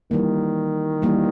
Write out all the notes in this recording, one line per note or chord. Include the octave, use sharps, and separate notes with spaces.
D#3 E3 G3 A#3
E3 G3 A#3